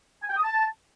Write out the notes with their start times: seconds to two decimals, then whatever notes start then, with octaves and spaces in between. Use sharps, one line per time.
0.22 G#5
0.29 G5
0.37 D#6
0.44 A5